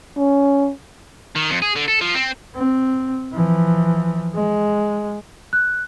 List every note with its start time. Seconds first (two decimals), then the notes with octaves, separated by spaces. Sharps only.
0.17 C#4
1.36 D#3
1.50 F2
1.62 G#4
1.76 D3
1.88 A4
2.01 F3
2.15 C4
2.55 C4
3.33 E3 F3
4.35 G#3
5.53 F#6